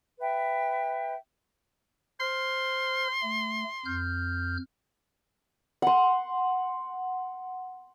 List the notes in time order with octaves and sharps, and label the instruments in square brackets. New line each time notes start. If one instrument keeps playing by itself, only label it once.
[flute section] B4 E5 G5
[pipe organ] C5 F6 [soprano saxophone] C6
[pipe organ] A3
F2 F6 G6
[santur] F#5 C6